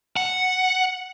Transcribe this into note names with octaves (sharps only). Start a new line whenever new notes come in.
F#5